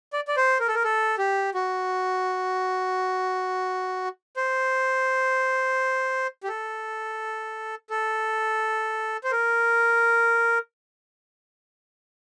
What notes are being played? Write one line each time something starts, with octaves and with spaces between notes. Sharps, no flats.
D5
D5
C5
A#4
A4
A#4
A4
G4
F#4
C5
G4
A4
A4
C5
A#4